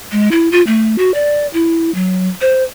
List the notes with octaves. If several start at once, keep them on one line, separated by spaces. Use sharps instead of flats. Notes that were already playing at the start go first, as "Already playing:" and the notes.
G#3
E4
F4
A3
F#4
D5
E4
F#3
C5